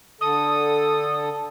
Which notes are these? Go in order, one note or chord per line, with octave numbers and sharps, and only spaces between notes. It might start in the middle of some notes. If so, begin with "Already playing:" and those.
D3 A4 D#6